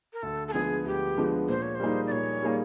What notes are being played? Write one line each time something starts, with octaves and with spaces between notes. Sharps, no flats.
A#4
D2 A4
A4
D3 F3 G#3 B3 G#4
D2 G4
D3 F3 G#3 B3
A#2 C5
C#5
C5
G3 A#3 D#4 G#4
D5
A#2 C#5
G3 A#3 D#4 G#4